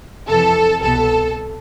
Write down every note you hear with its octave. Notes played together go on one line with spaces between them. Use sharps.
F2 C3 E3 A4
C2 B2 B3 A4